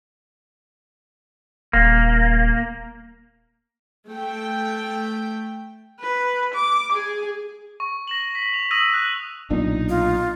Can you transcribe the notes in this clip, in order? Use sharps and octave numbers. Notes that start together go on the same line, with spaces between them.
D#1 A#3
A3 G5
B4
D6
G#4
C#6
A#6 E7 F#7
B6
F7
D#6 E6 A#6 D#7 F7 F#7
F#6
B1 A#2 D4 D#4
F4